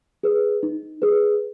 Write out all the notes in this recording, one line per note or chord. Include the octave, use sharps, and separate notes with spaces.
G#4 B4
D#4
G#4 B4